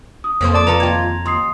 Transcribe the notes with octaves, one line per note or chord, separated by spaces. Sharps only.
D#6
F2 F3 A#3 C5
D5 A5 D6 D#6
F3 A4 B4 F5 A5 A#5
D#2 F4 G5 G#6
D#2 C6 D#6 C7